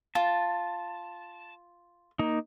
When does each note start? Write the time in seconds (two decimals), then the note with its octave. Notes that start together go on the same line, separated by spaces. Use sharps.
0.15 F4 A5
2.19 A#3 D#4